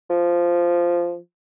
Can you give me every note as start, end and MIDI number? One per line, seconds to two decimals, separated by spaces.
0.10 1.17 53